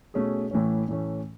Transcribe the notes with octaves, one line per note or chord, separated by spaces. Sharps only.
B2 A3 C#4 G#4
A2 E3 A3 C#4
A2 E3 A3 C#4